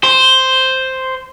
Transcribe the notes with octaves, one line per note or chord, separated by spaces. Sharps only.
C5